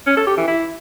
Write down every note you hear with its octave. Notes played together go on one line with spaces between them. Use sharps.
C#4
A4
G4
E3
E4